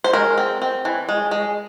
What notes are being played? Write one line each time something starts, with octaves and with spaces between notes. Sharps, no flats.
C5
G#3 A#4
C4
C4
E3
G#3
G#3